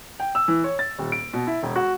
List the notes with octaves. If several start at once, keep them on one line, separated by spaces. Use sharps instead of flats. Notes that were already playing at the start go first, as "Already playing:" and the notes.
G5
E6
E3
C#5
A6
D#1
D7
B2
E4
E1
F#4